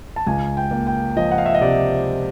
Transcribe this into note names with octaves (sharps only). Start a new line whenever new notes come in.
A5
C#2 G#5
G5
A#3
G5
F3 D#5
F#5
F5
E5
D#5
C3 D5